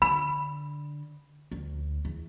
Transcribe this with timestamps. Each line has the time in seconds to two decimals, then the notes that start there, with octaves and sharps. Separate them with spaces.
0.02 D3 B5
1.52 D2
2.05 E2